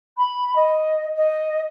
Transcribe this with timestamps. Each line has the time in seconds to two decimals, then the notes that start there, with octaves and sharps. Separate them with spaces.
0.17 B5
0.55 D#5
1.16 D#5